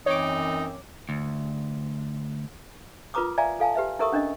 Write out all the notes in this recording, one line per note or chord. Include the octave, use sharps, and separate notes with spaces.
F#2 E3 C4 D#4 C#5 D6
D2
F4 A#4 B4 A#5 D6 D#6
D5 E5 F5 G#5 A#5
A4 F5 G#5 A5
G4 B4 E5
E4 A4 A#4 E5 C#6 D#6
C#4 D4 E4 D#5